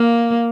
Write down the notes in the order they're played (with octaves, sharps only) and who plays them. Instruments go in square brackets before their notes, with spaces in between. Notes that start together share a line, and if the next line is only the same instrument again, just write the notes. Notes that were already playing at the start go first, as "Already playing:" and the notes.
Already playing: [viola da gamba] A#3 [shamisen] F5